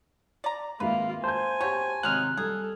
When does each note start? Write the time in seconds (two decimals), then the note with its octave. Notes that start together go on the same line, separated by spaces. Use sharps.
0.44 D5 A#5
0.80 G#1 G#3 A#3 F4 B4 E5
1.24 C5 G#5 A5 G6
1.61 B2 C4 G4 C#5 A5
2.03 G#1 C3 F#3 G#3 D#4 F6 F#6
2.37 G3 G#4 A4